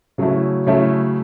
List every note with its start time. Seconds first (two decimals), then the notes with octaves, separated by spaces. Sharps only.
0.18 C#3 F#3 A3 E4
0.67 C#3 F#3 A3 E4